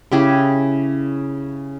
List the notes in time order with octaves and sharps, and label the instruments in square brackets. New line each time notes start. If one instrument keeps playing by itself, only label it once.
[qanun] C#3 E4 G4 G#4